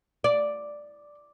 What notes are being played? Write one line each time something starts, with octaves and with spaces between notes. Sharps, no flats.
D5